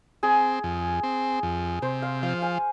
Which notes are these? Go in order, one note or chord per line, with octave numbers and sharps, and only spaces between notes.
C4 G#4
F2
C4
F2
C3 C5
F5
F3 F5
G#5